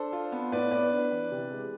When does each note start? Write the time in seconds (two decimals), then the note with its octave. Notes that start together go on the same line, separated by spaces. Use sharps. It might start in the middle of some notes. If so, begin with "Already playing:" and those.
Already playing: D4 A4 C5
0.13 F4
0.32 B3
0.52 A2 B4 D5
0.71 B3 B4 D5
0.92 D4
1.12 E3
1.31 C3
1.51 G#3